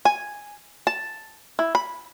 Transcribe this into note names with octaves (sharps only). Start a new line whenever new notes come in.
G#5
A5
E4
B5